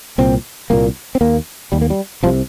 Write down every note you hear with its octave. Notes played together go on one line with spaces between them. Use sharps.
C2 A#2 C4
C2 A#2 A#3
C4
D#2 A#3
D#2 G3
A#3
G3
C2 C3 F3